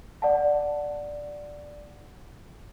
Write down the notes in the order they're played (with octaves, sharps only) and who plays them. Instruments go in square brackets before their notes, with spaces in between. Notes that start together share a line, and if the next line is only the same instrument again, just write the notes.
[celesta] D5 F#5 A5